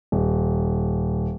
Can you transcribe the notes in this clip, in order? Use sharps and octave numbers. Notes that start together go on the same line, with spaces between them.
D#1